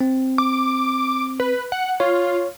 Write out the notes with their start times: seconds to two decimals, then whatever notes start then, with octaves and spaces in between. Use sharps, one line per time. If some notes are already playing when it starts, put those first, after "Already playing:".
0.01 C4
0.38 D6
1.40 B4
1.72 F#5
2.00 F4 C#5